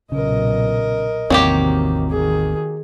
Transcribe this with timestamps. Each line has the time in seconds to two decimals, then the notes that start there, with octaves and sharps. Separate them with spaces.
0.12 B1 A#2 C#3 A#4 D#5
1.30 A1 E2 C3 D#3 F#3 A#3 C4 G4
2.11 D#3 G#4